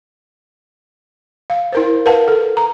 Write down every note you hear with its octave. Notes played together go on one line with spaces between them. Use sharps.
F5
E4 A#4 C5
A#4 B4 F5 F#5 A5
A4
A#5